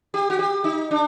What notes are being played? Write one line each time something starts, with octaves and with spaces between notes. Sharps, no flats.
G4
F#4
G4
D#4
D4